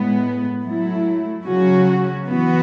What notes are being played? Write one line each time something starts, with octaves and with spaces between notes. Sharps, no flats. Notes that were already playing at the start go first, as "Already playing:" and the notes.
Already playing: A2 G#3 B3
F#3 A3 E4
C#3 F#3 C#4 F#4
E3 B3 F#4